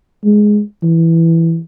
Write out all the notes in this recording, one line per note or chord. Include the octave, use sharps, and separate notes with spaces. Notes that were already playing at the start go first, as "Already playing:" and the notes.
G#3
E3